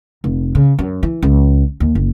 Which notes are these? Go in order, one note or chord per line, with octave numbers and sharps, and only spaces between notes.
F1
C#3
F#2
E3
C#2
D#2
F#1